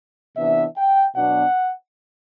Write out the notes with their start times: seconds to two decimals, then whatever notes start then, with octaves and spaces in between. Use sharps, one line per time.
0.37 C3 E3 B3 D4 E5
0.77 G5
1.16 B2 F#3 B3 D4 F#5